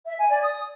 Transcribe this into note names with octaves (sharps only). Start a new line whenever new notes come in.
E5
G#5
D5
D#6